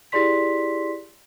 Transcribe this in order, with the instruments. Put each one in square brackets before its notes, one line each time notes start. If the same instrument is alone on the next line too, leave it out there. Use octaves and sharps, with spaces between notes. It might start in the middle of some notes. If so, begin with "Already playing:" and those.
[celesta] E4 G4 G#4 D5 C6 B6